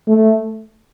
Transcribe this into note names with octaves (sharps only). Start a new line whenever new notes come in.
A3